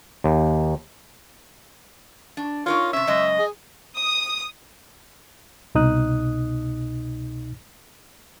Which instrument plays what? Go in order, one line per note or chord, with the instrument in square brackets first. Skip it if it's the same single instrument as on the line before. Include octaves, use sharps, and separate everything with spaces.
[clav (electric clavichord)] D#2
[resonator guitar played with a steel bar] D4
[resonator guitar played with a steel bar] D#4 A#4 C#5 [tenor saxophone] F4
[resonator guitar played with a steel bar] C3 C#4 [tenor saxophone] E5
[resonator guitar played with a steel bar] F#2 C#3 G#3 [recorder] D#5
[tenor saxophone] G#4
[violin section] D#6
[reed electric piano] C2 B2 D#4 D#6 F#6